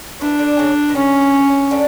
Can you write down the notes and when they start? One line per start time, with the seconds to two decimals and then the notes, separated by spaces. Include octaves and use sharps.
0.21 E3 D4
0.39 D3
0.59 C#3
0.89 B2
0.95 C#3 C#4
1.71 D3